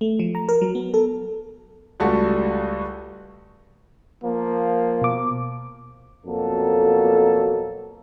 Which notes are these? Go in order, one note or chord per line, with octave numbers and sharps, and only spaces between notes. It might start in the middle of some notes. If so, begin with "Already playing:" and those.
A3
F3
A#5
A#4
F#3
B3
A4
C#2 G3 A3 F#4 A5 C#6
F3 A#3
B2 D6
F2 B2 F#3 A#3 A4